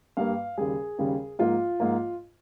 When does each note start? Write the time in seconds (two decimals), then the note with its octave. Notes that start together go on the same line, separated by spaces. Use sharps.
0.17 G2 G3 A#3 F5
0.58 D#2 C#3 G3 G#4
0.98 D#2 C#3 G3
1.39 G#2 F3 A#3 F4
1.80 G#2 F3 A#3